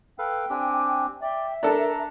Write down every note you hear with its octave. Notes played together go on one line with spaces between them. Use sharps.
A4 B4 F5 G5
C4 D4 G4 G#5
D5 E5 G5
D4 A4 A#4 A#5